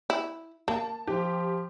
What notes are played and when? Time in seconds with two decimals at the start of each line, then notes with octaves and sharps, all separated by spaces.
0.10 E4
0.68 A#3 A5
1.07 F3 G4